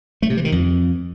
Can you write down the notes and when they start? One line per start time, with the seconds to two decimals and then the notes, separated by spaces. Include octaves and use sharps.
0.22 A3
0.30 C3
0.37 E3
0.45 D#3
0.52 F2